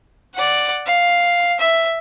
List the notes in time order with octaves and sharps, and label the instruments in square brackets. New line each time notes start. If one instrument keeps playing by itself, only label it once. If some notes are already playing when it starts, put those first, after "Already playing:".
[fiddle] D5 F#5
F5
E5